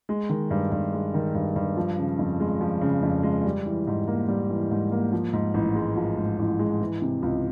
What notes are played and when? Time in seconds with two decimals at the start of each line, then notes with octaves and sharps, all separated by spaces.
0.09 G#3
0.29 D#3
0.51 G2
0.72 G2
0.93 G#3
1.14 D#3
1.35 G2
1.56 G2
1.77 F3
1.98 C#3
2.19 F2
2.40 G#3
2.61 F3
2.81 C#3
3.03 F2
3.23 G#3
3.45 G3
3.66 E3
3.87 G#2
4.08 A#3
4.28 G3
4.50 E3
4.71 G#2
4.92 A#3
5.13 F3
5.33 G#2
5.54 A1
5.75 G#3
5.97 F3
6.18 G#2
6.39 A1
6.59 G#3
6.81 E3
7.02 C3
7.22 C#2